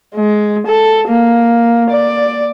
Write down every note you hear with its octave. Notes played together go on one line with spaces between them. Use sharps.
G#3
A4
A#3
D5